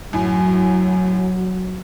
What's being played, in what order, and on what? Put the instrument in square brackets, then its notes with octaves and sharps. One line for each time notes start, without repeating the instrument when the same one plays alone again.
[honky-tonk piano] F#2 A2 [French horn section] F#3